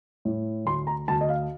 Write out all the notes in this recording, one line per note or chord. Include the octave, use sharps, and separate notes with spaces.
A2
D2 C6
A#5
D2 A5
D#5
F5